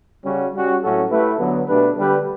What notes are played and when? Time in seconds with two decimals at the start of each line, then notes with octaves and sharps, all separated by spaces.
0.24 C#3 G3 C#4 F#4
0.53 G3 C#4 F#4
0.82 A2 F#3 C#4 F#4 A4
1.10 A3 E4 G4 B4
1.39 D3 F#3 B3
1.67 B2 A3 D4 G4 B4
1.96 D3 G3 D4 G4 B4